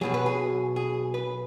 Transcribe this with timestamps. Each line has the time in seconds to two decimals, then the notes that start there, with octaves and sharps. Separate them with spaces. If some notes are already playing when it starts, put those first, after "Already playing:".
0.01 B1 B2 F#3 G#4
0.14 B4
0.26 G#4
0.76 G#4
1.14 B4